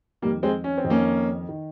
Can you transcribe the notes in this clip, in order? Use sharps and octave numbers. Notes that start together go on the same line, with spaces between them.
F2 D#3 G3 A#3
G#3 C4
C#4
C4
F2 D#3
A#3 C#4
D#3